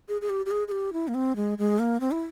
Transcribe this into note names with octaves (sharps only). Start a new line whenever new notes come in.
G#4
G#4
G4
G4
G#4
G#4
G4
E4
A#3
C4
G#3
G#3
A#3
C4
E4